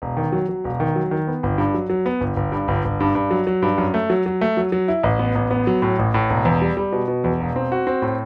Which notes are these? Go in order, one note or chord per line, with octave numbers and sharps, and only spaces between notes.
E1
D#3
F#3
F#3
E1
D#3
F#3
D#3
B3
G1
G2
F#3
F#3
B3
G1
G1
G2
G1
G1
G2
G2
F#3
F#3
G2
F#2
A3
F#3
F#3
A3
F#3
F#3
E4
A1
B3
A1
B3
F#3
A2
A1
A2
E1
E2
G3
G3
B2
B2
E2
E1
C4
F#4
C4
A2